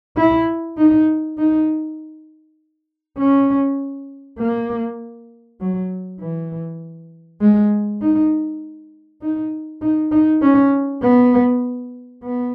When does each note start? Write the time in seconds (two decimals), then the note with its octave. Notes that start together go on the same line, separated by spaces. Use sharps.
0.17 E4
0.78 D#4
1.38 D#4
3.19 C#4
4.39 A#3
5.61 F#3
6.21 E3
7.41 G#3
8.02 D#4
9.22 D#4
9.82 D#4
10.12 D#4
10.42 C#4
11.02 B3
12.24 B3